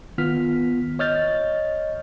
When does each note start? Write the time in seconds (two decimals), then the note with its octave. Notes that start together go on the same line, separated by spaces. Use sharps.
0.18 D#3 B3 F4 F6 B6
0.99 C#5 D#5 F6 G6 A6